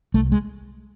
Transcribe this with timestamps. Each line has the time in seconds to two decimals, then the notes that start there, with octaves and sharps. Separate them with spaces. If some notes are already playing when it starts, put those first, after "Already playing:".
0.14 C2 A3
0.32 G#3